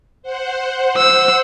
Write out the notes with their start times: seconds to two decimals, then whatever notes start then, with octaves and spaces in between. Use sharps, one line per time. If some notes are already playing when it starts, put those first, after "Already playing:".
0.23 C5 F#5
0.98 E6